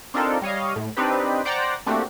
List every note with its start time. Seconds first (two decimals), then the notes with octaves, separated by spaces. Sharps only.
0.14 C4 D4 D#4 F4 A4 A#4
0.42 G3 C#5 D#5 F5
0.76 A2
0.97 C4 D4 D#4 G4 B4
1.45 C5 D5 F#5 G5 A#5
1.86 A3 A#3 C4 D4 F#4 G4